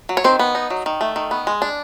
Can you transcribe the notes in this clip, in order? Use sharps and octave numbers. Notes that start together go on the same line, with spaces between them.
F#3
C#5
D#3 C4 C5
B3
D#4
F#3
D#3
A3
D#3
B3
G#3
D4